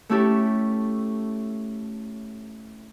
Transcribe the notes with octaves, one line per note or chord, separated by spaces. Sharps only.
A3 C#4 E4 G4 A4